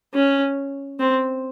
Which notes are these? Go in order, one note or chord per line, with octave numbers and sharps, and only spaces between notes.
C#4
C4